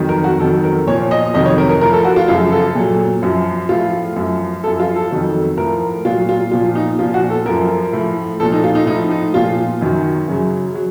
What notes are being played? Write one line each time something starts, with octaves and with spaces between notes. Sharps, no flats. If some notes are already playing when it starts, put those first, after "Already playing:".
Already playing: F2 D#3 F#3
A#4
F#4
F2 D#3 F#3 A4
A#4
A#2 F3 C#5
D#5
F2 C3 D#3 F#3 D#5
C#5
A#4
A#4
A2 F3 A#4
A4
F#4
F4
F#2 C#3 F3 F4
A4
A#2 F#3
F#2 F3
A2 F3 F4
F#2 F3
F#2 F3 A4
F4
A4
F2 D#3 F#3
A2 F3 A#4
A#2 F#3 F4
F4
A#2 F3 F4
D#4
A#2 F3 F4
F#4
A4
F#2 F3 A#4
A2 F3
A#2 F3 A4
D#4
F4
D#4
A2 F3 D#4
D#4
A#2 F3 F4
F#2 D#3 F#3
F#2 C#3 F#3
F#3